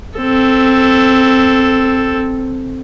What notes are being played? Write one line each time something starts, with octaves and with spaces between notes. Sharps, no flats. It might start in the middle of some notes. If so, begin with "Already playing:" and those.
C4 A4